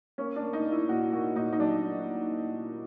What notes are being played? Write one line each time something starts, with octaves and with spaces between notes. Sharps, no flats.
A#3 C#4
D4
A#3
D#4
A#3
E4
A#2 F#4
A#3 F#4
A#2 D#4
D#4
F#3 D4